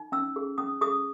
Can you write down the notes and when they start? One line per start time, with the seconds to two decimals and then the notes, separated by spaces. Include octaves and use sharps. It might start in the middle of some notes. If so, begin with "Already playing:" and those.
Already playing: D#4
0.12 C#4 E6
0.36 G#4
0.58 C#4 D#6
0.81 G#4 D#6